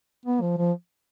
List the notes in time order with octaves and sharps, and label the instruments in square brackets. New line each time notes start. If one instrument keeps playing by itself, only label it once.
[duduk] B3
F3
F3